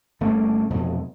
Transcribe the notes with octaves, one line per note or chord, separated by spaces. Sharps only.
G1 A3 A#3 C#4
F1 F2 B2 F#3